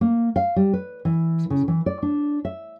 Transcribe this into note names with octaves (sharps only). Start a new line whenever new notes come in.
A#3
F5
G3
B4
E3
C#3
E3
D5
D4
E5